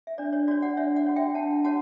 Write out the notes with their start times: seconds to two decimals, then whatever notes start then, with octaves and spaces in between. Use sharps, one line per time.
0.07 E5
0.18 D4 D5
0.33 C#5
0.48 F#4 C#5 D5
0.62 D5 F#5
0.77 D4 C#5 E5
0.96 D5 F#5
1.06 F#4 C#5
1.16 E5 G5
1.35 D4 F#5 A5
1.64 F#4 C#5 F#5 A5